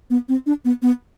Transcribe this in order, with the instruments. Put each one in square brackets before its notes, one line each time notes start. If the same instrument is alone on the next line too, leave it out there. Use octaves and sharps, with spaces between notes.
[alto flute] B3
C4
D4
B3
B3